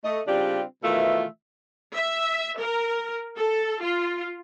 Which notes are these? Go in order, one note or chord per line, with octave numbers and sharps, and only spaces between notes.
A3 D#5
C#3 G3 C4 D4 F4 G4
B2 D#3 E3 A3 F4 E5
E5
A#4
A4
F4